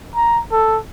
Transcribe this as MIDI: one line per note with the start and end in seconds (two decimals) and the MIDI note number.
0.16 0.40 82
0.52 0.78 69